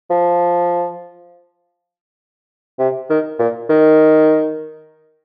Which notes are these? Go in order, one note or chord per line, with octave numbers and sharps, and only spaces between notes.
F3
C3
D#3
A#2
D#3